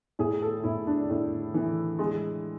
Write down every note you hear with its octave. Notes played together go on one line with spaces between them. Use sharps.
A2 G#4
A4
A2 E4
D4
A2
E3
G#3